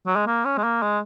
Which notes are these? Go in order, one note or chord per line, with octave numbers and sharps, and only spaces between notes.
F#3
G#3
A#3
C#4
G#3
A#3
G#3